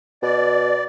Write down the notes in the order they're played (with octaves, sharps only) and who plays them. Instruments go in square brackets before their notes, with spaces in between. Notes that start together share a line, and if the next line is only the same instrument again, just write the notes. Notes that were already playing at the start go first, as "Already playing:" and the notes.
[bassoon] B2 [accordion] D5